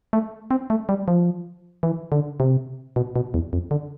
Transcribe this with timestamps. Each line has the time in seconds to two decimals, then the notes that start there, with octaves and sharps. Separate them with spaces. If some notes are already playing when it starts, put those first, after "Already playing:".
0.13 A3
0.51 C4
0.70 A3
0.89 G3
1.08 F3
1.83 E3
2.12 D3
2.40 C3
2.96 B2
3.16 B2
3.34 E2
3.53 F2
3.71 D3